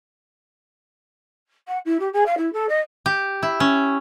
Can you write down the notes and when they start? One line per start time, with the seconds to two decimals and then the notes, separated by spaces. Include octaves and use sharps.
1.67 F#5
1.85 E4
1.99 G4
2.13 G#4
2.25 F5
2.37 E4
2.53 A4
2.68 D#5
3.06 G4
3.43 E4
3.60 C#4